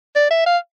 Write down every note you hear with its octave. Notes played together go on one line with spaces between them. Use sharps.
D5
E5
F5